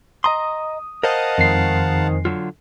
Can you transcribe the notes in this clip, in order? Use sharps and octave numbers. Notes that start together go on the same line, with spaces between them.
D#5 A#5 C6 D#6
A#4 C5 D#5 F5 F#5 A5
F2 D#3 G#3 C7
D3 F#3 F4